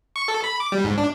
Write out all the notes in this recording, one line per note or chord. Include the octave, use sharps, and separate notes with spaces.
C#6
A4
B5
D6
G3
G#2
D4